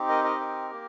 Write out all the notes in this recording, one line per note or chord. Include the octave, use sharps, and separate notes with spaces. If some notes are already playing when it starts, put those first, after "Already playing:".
Already playing: C4 D#4 G4
A#4 D#5
A#4 D#5
A#4
A#3 G4